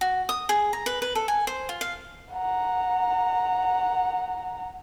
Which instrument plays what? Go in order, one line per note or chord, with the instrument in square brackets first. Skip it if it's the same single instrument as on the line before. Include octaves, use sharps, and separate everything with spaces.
[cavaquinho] F#4
D#6
G#4
A#5
B4
B4
A4
G#5
C5
F4
F5
[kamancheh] F#5 A#5